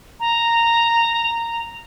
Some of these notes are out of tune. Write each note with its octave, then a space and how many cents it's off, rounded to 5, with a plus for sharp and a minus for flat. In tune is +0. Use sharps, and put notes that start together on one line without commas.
A#5 -10